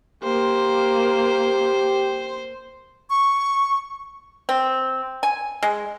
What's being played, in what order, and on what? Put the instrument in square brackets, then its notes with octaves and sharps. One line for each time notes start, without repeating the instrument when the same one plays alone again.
[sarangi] A#3 [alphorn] G4 [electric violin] C5
[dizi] C#6
[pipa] C4
G#5
G#3